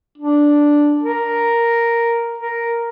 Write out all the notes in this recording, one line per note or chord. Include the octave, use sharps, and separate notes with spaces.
D4
A#4
A#4